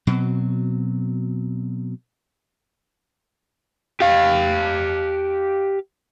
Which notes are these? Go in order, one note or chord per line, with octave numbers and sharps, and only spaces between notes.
B2 F#3 C4
G4 F5